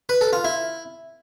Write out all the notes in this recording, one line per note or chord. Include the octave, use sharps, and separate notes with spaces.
B4
A4
F4
E4